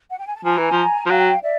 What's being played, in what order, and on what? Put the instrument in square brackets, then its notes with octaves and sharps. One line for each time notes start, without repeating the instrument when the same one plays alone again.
[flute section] F#5
G5
G#5
A5
[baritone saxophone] F3 [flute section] G#5 A#5
[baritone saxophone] E3
F3
F3
[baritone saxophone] F#3 [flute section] F5 G5
[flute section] D5 E5